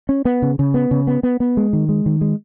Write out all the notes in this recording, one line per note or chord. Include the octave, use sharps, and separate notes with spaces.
C#4
B3
C#3
C#3
B3
C#3
B3
B3
B3
G#3
D#3
G#3
D#3
G#3